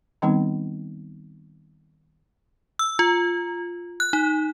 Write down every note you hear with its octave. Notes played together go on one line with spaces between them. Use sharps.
D#3 G3 B3 C4 D#4
E6
F4
F#6
D#4